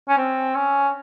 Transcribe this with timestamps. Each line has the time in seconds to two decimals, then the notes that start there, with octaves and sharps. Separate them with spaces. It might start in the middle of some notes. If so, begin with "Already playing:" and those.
0.09 C#4
0.17 C4
0.55 C#4